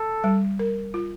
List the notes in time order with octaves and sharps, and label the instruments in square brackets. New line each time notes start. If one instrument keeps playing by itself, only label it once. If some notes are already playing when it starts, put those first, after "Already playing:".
Already playing: [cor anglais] A4
[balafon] G3
A#4
F4